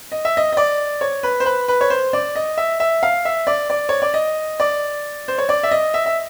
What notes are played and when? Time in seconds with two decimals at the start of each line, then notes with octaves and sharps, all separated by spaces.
0.12 D#5
0.25 E5
0.37 D#5
0.53 D#5
0.57 D5
1.01 C#5
1.23 B4
1.40 C5
1.46 B4
1.68 B4
1.81 C#5
1.90 C5
2.13 D5
2.36 D#5
2.58 E5
2.80 E5
3.03 F5
3.25 E5
3.47 D5
3.70 D5
3.89 C#5
4.02 D5
4.14 D#5
4.60 D5
5.28 C5
5.38 C#5
5.49 D5
5.63 E5
5.71 D#5
5.94 E5
6.06 E5